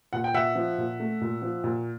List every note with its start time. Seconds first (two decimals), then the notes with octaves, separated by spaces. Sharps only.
0.13 A#2 F#5
0.24 G5
0.34 A#2 E5 F#5
0.55 F3
0.78 A#2
1.00 A3
1.21 A#2
1.42 F3
1.64 A#2